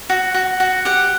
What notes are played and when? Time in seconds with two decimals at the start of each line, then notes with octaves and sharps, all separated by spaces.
0.10 F#4
0.35 F#4
0.60 F#4
0.85 G4 F#5